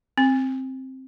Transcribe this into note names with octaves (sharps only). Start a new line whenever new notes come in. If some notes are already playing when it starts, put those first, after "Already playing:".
C4